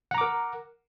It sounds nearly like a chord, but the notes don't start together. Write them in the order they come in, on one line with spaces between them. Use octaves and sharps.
F#5 A#5 D6 A#4